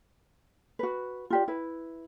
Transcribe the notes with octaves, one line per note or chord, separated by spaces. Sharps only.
F#4 B4
F4 G4 D5
E4 B4